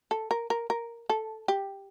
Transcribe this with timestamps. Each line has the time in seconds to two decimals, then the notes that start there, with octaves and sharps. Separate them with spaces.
0.11 A4
0.31 A#4
0.50 A#4
0.70 A#4
1.10 A4
1.48 G4